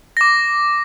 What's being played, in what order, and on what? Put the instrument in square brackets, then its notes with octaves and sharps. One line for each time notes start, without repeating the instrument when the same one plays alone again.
[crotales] D6 A#6